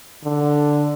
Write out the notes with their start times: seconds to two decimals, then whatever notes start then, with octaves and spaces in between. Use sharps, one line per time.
0.24 D3